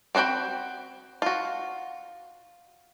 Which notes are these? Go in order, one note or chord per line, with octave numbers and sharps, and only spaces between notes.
C4 F#4 G#4 G5 B5
F4 F#4